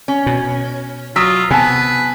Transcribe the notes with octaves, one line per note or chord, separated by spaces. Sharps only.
C#4
B2
F#3 F4 D#6 E6 B6
C3 B3 B4 G#5 A5